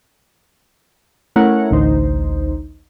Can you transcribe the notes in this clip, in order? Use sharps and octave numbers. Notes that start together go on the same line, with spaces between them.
A3 C#4 E4 A#4 C#5 F#5
A1 D2 D#4 C5